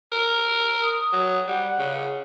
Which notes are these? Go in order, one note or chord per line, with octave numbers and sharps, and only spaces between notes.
A#4
D#6
F#3
G3 F#5
C#3